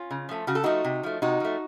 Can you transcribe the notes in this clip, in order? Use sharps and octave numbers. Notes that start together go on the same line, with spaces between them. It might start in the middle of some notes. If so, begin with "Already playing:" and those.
Already playing: C#4 F4
C#3
F3 A3
C#3 F#4
A4
F3 A3 D#4 F#4
C3
F3 A3
C3 D#4 F#4
F3 A3